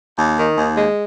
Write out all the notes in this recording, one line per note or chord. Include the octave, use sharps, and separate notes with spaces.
D#2
D#3
D#2
G#3